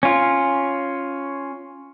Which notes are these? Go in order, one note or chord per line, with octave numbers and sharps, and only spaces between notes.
C#4 F4